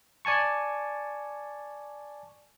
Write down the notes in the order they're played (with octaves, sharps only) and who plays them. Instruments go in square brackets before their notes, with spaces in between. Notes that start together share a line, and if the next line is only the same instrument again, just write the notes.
[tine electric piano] D5 G#5 A5 C#6